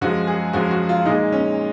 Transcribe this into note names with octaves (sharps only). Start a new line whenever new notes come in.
F#2 F3 G#3 F#4
G#4
F#2 F3 G#3 F#4
F#4
F4
A#2 G#3 D#4
C#4